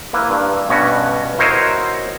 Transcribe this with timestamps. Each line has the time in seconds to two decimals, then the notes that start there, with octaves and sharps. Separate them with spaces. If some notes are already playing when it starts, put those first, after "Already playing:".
0.13 A#3 E4 B4
0.30 G2
0.69 G2 B2 B3 C#4 F#4
1.38 E4 F#4 A#4 C5 C#5 D#5